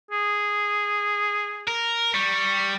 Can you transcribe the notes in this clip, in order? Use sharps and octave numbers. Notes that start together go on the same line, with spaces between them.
G#4
A#4
G3 C#6